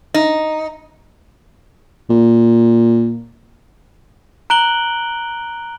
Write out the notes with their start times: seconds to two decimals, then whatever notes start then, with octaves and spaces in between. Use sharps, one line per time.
0.14 D#4
2.10 A#2
4.50 A#5 F#6 D7 F#7 G7